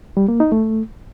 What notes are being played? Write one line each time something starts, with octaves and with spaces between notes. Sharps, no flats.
G3
A#3
D#4
A3